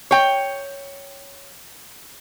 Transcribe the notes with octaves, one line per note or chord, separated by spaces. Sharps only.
C#5 G5